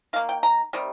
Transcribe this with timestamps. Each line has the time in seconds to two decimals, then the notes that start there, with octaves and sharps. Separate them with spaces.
0.13 D#3 F5
0.16 A#3
0.29 G5
0.43 A#5
0.73 C3 D#3 G3